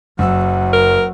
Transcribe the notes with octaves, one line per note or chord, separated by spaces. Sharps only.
F#1 F#3 F#5 E6
A#4